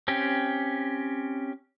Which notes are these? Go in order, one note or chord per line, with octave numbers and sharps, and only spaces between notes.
C4 C#4 G4